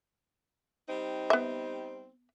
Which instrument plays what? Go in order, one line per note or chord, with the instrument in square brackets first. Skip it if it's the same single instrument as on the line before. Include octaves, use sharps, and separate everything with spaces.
[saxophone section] G3 C4 D#4
[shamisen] B3 E5